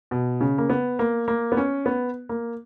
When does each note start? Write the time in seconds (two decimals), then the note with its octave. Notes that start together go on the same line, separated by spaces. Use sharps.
0.11 B2
0.41 C#3
0.58 A#3
0.70 B3
0.99 A#3
1.28 A#3
1.52 B3
1.57 C#4
1.86 B3
2.29 A#3